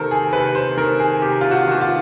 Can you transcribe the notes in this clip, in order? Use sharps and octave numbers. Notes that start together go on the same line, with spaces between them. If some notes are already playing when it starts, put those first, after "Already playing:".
Already playing: C3 D#3 A4 A#4 C5
G#4
C3 B4
C5
D#3 A#4
G#4
C3 G4
F4
F#4
D#3 F#4
F4